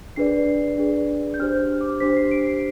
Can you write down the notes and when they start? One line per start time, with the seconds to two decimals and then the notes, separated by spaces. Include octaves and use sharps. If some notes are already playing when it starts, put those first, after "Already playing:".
0.16 D4 G#4 B4 D5 C7
0.78 D4 G#4 B4 D5
1.34 G6
1.39 D4 G4 C5 F6
1.81 D6
2.00 D4 G4 C5 B6
2.17 C7
2.31 D7
2.47 C7